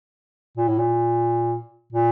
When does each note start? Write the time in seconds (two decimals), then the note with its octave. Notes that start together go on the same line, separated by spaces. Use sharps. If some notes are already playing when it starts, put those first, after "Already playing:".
0.57 A#2
0.68 A2
0.78 A#2
1.93 A#2